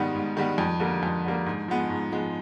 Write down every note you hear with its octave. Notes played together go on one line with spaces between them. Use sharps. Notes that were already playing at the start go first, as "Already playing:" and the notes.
Already playing: G#2 D#3 G3 B3
G#2
D#3 G3 B3
F2
D3 G3 A#3
F2
D3 G3 A#3
G#2
F3 G#3 B3
G#2
F3 G#3 B3